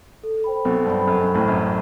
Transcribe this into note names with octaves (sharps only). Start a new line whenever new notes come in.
A4
C5 G5 B5
B1 B2 A4
G2 C5 G5 B5
F#2 A4
F#2
C5 G5 B5
A1 A2
F#2 A4